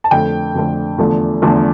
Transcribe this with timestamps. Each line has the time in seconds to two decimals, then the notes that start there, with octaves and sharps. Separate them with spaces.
0.04 A5
0.11 F2 D3 A3 G5
0.55 F2 D3 A3
0.98 E2 D3 F3 A3
1.42 E2 D3 F3 A3